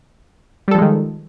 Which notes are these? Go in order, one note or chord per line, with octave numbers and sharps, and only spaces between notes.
D#3 F3 G3 G#3 A4